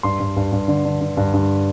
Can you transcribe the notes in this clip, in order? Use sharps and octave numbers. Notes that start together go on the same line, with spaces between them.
G2 C6
G2
G2
G2
D3
D3
D3
G2
G2